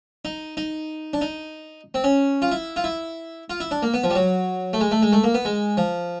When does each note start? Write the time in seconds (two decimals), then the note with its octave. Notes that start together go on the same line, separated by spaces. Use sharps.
0.25 D#4
0.57 D#4
1.13 D4
1.21 D#4
1.94 C4
2.04 C#4
2.42 F4
2.52 E4
2.76 F4
2.84 E4
3.50 F4
3.60 E4
3.71 D4
3.83 A#3
3.94 B3
4.04 F3
4.10 G3
4.15 F#3
4.73 A3
4.81 G#3
4.91 A3
5.02 G#3
5.12 A3
5.24 A#3
5.34 B3
5.45 G#3
5.77 F3